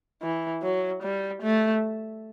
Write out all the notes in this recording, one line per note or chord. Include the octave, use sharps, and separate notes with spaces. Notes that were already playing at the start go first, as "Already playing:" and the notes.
E3
F#3
G3
A3